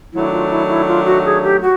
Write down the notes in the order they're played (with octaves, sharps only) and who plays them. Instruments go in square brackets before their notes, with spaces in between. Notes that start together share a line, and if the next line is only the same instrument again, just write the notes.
[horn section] D#3 F#3 A3 D4 [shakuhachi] E4
[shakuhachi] F4
E4
E4
F4
F#4
G#4
G4
F#4